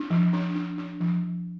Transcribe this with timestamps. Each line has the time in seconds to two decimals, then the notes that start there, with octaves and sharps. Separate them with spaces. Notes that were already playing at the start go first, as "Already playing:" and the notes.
Already playing: D4
0.10 F3
0.33 D4
0.56 D4
0.78 D4
1.01 F3
1.23 F3